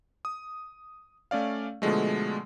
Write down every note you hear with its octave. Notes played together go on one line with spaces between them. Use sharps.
D#6
A3 C#4 D5 F5
B2 D3 F3 G#3 A3